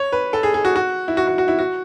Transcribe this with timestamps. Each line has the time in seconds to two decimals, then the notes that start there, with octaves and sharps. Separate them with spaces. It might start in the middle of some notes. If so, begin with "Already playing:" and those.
Already playing: C#5
0.12 B4
0.33 A4
0.43 G#4
0.54 G#4
0.65 F#4
0.76 F#4
1.08 E4
1.17 F#4
1.27 F#4
1.38 F#4
1.48 E4
1.59 F#4